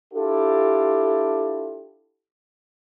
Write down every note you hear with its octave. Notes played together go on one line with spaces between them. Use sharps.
D4 E4 F4 G4 A4